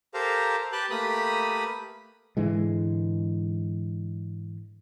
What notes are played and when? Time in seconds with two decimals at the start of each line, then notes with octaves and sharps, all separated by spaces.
0.14 G4 A4 A#4 C5 F5 A#5
0.72 G4 B4 G5 A5 F#6
0.90 A3 A#3 G4 B4 B5 D#6
2.37 G#2 D3 E3 G#3